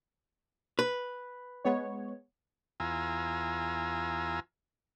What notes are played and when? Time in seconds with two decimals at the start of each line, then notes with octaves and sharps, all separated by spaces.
0.79 B4
1.65 G#3 B3 C#5
2.80 E2 F4 G#5 A#5 E6